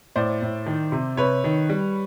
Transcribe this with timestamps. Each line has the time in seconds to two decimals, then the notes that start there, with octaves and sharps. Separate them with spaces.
0.16 A2 C5 D5
0.42 A2
0.66 D#3
0.92 C3
1.17 C3 B4 C#5
1.44 D#3
1.69 G3